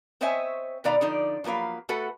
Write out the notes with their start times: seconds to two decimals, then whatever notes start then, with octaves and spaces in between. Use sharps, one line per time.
0.21 C4 C5 C#5 D#5 E5 G#5
0.84 B2 D#3 B4 D5 F5 A#5
1.01 D3 F3 D#4 D5
1.44 F3 F#3 A#3 B4 F5
1.89 A3 F#4 A4 B4 F#5